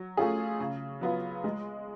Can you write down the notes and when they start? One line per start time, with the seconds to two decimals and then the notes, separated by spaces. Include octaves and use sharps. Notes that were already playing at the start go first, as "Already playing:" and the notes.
Already playing: F#3
0.17 A3 C#4 F4 G#4
0.60 C#3
1.01 F#3 B3 F4
1.44 G#3